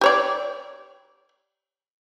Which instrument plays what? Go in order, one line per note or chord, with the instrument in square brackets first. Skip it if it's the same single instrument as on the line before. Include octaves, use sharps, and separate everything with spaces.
[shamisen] G4 C#5 D5